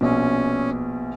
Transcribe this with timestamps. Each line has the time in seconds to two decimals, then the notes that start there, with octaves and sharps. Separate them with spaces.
0.01 A#1 B2 C#4